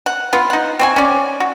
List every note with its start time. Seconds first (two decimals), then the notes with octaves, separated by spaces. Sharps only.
0.06 F#5
0.33 B3 F4
0.50 D#4 F#5
0.79 C4 F#4 G#5
0.96 C#4 D5
1.40 F#4